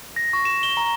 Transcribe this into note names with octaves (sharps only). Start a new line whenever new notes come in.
A#6
C#6
E7
G7
A#5